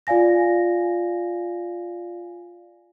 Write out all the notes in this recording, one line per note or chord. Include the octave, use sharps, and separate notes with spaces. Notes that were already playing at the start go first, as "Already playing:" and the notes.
F4 D5 F5 G#5 A#6